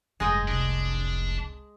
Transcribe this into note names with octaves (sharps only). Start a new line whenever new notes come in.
F1 G2 G#3 D#5 G5
C2 C3 D4